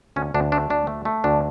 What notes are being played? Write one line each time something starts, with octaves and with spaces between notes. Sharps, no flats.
D2 C#4
D2 D4
A3 D4
D2 D4
A3
A3
D2 D4